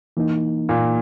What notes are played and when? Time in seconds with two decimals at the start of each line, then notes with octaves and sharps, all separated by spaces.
0.17 E3 A#3 D#4
0.69 A#2